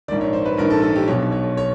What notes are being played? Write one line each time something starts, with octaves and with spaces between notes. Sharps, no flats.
A#1 G#2 D#3 D5
C#5
C5
B4
A#1 G#2 D#3 A#4
A4
A4
G4
B1 B2 C#5
C#5
C#5